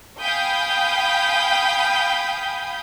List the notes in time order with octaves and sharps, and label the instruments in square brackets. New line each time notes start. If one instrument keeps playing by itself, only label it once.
[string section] F5 G5 G#5 B5 D#6 G6